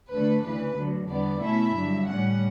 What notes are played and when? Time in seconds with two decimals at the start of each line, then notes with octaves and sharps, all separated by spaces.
0.11 D2 D3 A3 D4 B4
0.43 D2 C#3 E3 B4
0.76 D2 D3 F#3
1.08 E2 D3 G3 B3 D5
1.41 B2 A3 C#4 E4 E5
1.74 G2 D3 F#3
2.06 A2 G3 C#4 F#5